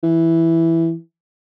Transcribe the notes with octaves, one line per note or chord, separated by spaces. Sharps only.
E3